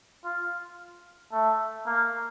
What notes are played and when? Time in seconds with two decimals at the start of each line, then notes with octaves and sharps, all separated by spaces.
0.25 F4
1.32 A3
1.86 A#3